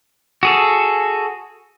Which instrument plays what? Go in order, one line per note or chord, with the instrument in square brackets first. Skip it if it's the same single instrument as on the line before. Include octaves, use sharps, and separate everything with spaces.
[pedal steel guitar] F#4 G#4 A4